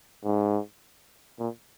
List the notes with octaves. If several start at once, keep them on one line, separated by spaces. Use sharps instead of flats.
G#2
A#2